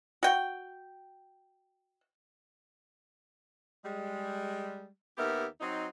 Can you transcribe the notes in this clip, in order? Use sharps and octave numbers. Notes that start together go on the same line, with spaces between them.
F#4 G5
G3 G#3
D#2 B3 G4 A#4 E5
F#3 C4 D#4